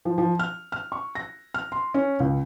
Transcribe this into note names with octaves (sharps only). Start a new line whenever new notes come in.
F3
F3
F6
F6
C#6
A#6
F6
C6
C#4
C#2